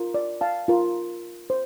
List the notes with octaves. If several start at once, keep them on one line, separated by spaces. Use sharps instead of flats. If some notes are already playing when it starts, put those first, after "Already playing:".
Already playing: F4 A#4
D5
F5 A5
F4 A#4
C5